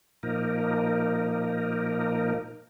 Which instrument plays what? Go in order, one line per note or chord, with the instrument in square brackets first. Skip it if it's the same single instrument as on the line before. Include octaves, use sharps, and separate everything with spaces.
[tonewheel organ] A#2 F3 A#3 D#4 A#4